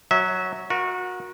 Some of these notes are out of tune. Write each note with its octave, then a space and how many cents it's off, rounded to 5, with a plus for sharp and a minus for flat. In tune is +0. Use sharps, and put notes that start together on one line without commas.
F#3 +0 E5 -25
F#4 -25 A#4 +20